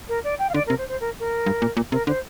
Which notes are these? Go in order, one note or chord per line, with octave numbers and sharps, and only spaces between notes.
A#4
D5
G5
F5
D3 D5
A#4
C3
C5
C5
A#4
A#4
G2
A#2
A#2
C3 A#4
D3 C5